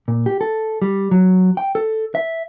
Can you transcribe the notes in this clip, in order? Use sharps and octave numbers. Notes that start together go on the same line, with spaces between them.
A#2
G4
A4
G3
F#3
G5
A4
E5